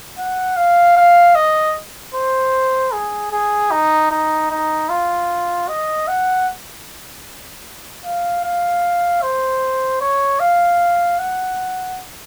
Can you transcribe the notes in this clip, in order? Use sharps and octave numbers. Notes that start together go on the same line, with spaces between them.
F#5
F5
F5
D#5
C5
G#4
G#4
D#4
D#4
D#4
F4
D#5
F#5
F5
F5
C5
C#5
F5
F#5